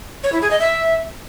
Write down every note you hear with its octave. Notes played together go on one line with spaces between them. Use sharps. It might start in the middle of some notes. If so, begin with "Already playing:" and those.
C#5
E4
G#4
D#5
E5